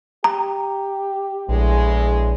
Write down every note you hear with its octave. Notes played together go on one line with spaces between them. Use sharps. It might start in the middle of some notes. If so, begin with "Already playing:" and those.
G4 A#5
A#1 E2 A2 G#3